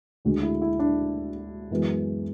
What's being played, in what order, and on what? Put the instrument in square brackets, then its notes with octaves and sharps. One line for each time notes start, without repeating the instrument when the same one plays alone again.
[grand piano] D2 D3 G#3 F#4
E4
E4
D4
F#2 E3 G#3 B3